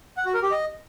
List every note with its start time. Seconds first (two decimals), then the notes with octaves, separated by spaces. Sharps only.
0.17 F#5
0.26 F#4
0.34 A#4
0.43 G4
0.51 D#5